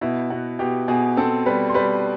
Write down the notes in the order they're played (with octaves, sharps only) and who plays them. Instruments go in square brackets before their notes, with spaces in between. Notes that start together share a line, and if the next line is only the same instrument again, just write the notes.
[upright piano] B2 [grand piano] E4 E5
[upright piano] B2 [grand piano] F#4 F#5
[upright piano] B2 [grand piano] G4 G5
[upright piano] B2 [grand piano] G#4 G#5
[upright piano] C4 [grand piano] A4 A5
[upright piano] G3 [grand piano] B4 B5
[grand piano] C6
[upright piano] G3 [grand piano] B4 B5